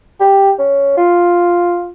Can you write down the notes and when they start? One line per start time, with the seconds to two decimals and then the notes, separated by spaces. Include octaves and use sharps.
0.20 G4
0.58 C#4
0.97 F4